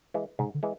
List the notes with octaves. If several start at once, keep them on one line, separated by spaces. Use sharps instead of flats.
E3 G#3
G#2 C3
D3
E3 G#3